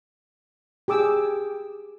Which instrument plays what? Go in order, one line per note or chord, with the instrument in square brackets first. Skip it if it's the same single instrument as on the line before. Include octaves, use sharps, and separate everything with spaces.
[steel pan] G4 G#4 D6 E6